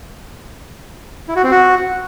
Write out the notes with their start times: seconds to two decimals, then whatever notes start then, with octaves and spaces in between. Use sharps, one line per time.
1.28 E4
1.36 F#4
1.44 C4
1.51 F#4